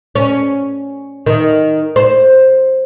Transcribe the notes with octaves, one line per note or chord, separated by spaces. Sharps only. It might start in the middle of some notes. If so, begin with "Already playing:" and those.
C#4
D#3
C5